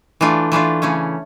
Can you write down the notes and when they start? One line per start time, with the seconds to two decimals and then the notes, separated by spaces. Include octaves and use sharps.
0.21 E3 A3 D4 F4
0.52 E3 A3 D4 F4
0.82 C#3 E3 A3 C#4